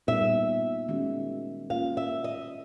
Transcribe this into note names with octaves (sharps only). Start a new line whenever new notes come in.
A#2 G3 B3 D#4 G#4 E5
D#3 G#3 C#4 F#4
A#3 C#4 F4 F5
E5
D#5